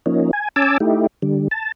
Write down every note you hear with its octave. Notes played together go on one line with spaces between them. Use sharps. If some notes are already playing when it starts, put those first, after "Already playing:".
F3 A#3 C#4 D#4
G#5
C#4 G#5 A5 D6 E6
A3 D#4 E4 G4
D3 G3
A5